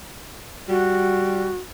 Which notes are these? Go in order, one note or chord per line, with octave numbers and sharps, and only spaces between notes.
G3 F#4